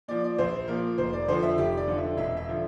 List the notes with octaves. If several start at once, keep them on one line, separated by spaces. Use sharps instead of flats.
A#2 F3 D5
D5
A#1 C5
A#2 F3 A#4
F1 C5
D5
F2 D3 F3 C5
E5
F1 G4
D5
F2 D3 F3
E5
E1 E5
E5
D3 F3